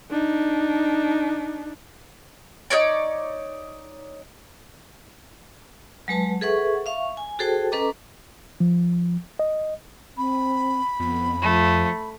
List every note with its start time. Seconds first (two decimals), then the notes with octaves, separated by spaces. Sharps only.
0.10 D4 D#4
2.70 D#4 F#4 C#5 D5
6.08 F#3 G#3 B4 A5
6.41 G#4 A4 B4 E5 F#5 C#6
6.86 E5 F5 C#6
7.17 G#5
7.39 F#4 G#4 A4 C5 G5 A5
7.72 C#4 A4 B4 D#5 A#5 D6
8.60 F3
9.39 D#5
10.17 C4 B5
11.00 F2 B3
11.42 F3 A3